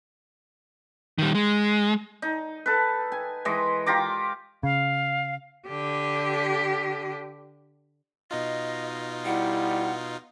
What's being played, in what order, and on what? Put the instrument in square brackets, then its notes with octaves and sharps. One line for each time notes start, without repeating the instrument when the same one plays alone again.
[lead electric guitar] D#3 G3
G#3
[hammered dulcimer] D#4
A4 B4
G#5
E3 G#3 D#5
F4 G4 A#5 D6
[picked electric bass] C#3 [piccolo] F5
[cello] D3 G4
[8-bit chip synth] B2 D#4 F4 [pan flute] D#5
[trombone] G3 [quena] E4 [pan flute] F#5